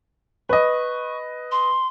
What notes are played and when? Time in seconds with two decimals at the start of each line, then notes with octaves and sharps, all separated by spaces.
0.49 B4 D#5 C#6
1.51 C6